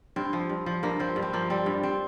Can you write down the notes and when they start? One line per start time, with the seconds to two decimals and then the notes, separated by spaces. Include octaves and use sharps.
0.16 G2 C4
0.33 F3
0.49 G2
0.66 F3
0.83 G2 A#3
0.99 F3 C4
1.16 G2
1.22 C4
1.33 F3 A#3
1.50 G3 C4
1.66 G2
1.83 C4